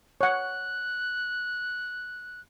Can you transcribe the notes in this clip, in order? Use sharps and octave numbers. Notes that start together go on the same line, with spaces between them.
C#5 F#5 F#6